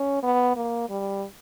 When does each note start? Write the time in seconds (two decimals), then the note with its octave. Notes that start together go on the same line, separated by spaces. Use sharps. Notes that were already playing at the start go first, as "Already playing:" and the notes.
Already playing: C#4
0.23 B3
0.57 A#3
0.90 G3